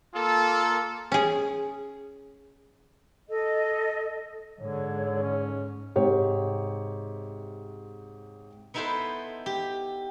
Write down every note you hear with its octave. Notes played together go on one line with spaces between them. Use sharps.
A#3 F4 A4
C#4 G#4
A4 D#5
G#2 D3 C#5
C#4
G#2 C3 G4 C#5
B3 D#4 E4 A4 B4 C5
G4